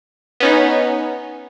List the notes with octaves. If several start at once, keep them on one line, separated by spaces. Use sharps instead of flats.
B3 C#4 D#4